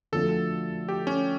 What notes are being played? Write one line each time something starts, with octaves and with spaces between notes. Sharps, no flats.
D3 F3 A3 D4 F#4 A4
G4
C#4